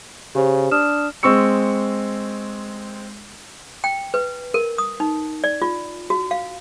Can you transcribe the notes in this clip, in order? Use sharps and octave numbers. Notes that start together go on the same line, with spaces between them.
C#3 G4 C5
D4 D#6 F6 E7
G#3 C4 C#6 E6 C#7
G5
B4
A#4
D#6
D#4
D5
F4
F#4
F5